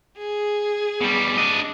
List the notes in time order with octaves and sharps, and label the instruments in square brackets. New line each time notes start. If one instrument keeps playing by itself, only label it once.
[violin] G#4
[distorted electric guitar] B2 G3
D4 D#5